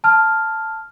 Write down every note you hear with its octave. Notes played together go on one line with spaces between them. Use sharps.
A5 F6